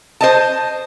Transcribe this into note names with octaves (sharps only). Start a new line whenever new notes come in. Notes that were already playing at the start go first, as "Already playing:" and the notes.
C5 D#5 A5